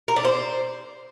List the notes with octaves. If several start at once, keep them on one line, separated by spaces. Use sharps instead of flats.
A#4
D4
C5